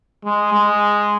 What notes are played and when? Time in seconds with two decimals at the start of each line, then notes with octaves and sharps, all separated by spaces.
0.25 G#3
0.53 G#3